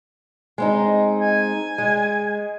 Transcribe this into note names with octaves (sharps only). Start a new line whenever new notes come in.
G#3 C4 D#4
G#5
G#3